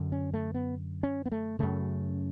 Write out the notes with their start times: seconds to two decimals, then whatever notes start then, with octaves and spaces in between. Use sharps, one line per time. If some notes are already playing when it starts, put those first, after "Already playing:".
Already playing: F#2 D3
0.12 C#4
0.34 A3
0.54 B3
1.03 C#4
1.26 B3
1.32 A3
1.59 F#2 C#3 A3